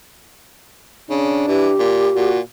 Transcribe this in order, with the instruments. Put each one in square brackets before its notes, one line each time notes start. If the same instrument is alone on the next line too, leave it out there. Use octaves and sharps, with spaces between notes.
[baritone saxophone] C#3 [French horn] D4
[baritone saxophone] E3 [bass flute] G4
[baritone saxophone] A#2
[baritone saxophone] A#2 [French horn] F#4